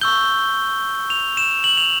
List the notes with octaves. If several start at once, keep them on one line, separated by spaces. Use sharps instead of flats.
C#6 E6 G6 G7
F7
E7
F#7
F7